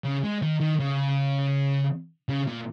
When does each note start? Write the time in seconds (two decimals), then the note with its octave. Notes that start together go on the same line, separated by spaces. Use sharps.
0.04 C#3
0.24 G#3
0.42 D#3
0.61 D#3
0.79 C#3
2.29 C#3
2.47 A#2